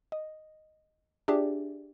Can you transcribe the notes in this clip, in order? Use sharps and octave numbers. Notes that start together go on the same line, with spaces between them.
D#5
D4 F4 G4 G#4 D5 E5